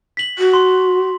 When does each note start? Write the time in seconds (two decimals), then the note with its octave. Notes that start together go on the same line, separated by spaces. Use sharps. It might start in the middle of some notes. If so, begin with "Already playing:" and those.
0.17 B6 F#7
0.38 F#4
0.53 C6